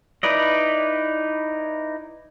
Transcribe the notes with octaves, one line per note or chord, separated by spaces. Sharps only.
D#4 E4 B4 D5 D#5